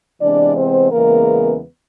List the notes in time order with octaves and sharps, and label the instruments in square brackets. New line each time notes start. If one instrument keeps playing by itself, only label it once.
[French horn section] C3 E3 G#3 B3 D4 D5
C4 C5
E2 C#3 E3 G#3 A#3 B3 A#4